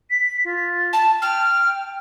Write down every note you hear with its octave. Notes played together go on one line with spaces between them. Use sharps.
B6
F4
A5
G5 F6